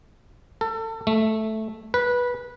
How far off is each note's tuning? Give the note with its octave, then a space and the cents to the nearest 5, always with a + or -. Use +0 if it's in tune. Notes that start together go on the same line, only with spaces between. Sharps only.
A4 +30
A3 -5
B4 -15